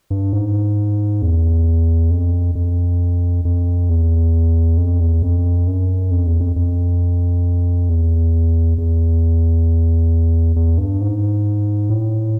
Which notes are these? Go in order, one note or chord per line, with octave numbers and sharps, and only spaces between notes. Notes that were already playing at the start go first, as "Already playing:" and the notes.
G2
G#2
E2
F2
F2
F2
E2
F2
E2
F2
F#2
F2
E2
F2
F2
E2
E2
E2
G2
G#2
A2